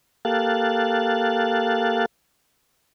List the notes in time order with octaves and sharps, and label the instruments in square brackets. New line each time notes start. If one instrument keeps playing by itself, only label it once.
[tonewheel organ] A#3 G4 A4 F5 F#6 A6